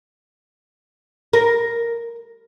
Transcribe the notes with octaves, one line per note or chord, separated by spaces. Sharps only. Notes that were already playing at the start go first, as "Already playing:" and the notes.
A#4